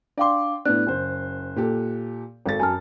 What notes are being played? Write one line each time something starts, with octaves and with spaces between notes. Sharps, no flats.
D4 D5 F5 G5 C6 D6
A2 B3 D4 F#6
F#1 C5
A#2 G4 A4
G#1 A4 A6
F#2 G#5 A5 F6